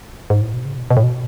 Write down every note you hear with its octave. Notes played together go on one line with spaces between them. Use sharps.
G#2
A2
B2
C#3
B2
B2
A2
B2